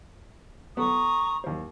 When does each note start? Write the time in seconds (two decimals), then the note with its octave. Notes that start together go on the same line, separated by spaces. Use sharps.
0.77 B3 A4 A#5 C#6 D#6
1.44 D#2 C5